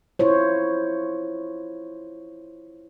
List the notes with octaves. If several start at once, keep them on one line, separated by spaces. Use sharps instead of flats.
E4 F4 C5 C#5